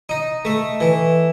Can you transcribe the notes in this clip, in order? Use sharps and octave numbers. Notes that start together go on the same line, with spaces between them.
D#4
A3
E3